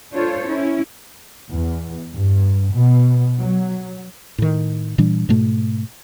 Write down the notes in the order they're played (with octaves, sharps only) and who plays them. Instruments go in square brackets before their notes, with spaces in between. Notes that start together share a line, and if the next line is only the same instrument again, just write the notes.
[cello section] D4 F4 A4 C5 C#5
C#4 E4
[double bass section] E2
G2
B2
F#3
[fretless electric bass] A2 D#3
A#2 E3 G3 D4
G#2 B2 A3